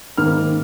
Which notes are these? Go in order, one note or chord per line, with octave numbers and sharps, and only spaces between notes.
G#2 D#3 A#3 D#4 F6